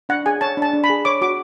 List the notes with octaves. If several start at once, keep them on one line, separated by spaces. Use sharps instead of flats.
D4 F#5
G#4 G#5
C#5 A5
D4 A5
D4
B5
G#4
C#5 D6
F#4 D6